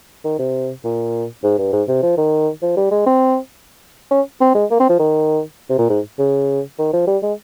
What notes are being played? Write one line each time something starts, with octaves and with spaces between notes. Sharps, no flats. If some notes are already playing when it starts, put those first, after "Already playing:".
D#3
C3
A#2
G#2
G2
G#2
C3
F3
D#3
F3
G3
G#3
C4
C#4
C4
G#3
A#3
C4
F3
D#3
C3
A#2
G#2
C#3
D#3
F3
G3
G#3